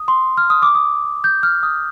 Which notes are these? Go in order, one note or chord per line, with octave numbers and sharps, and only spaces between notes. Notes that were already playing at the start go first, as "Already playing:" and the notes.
Already playing: D#6
C6
F6
D#6
D6
D#6
G6
F6
D#6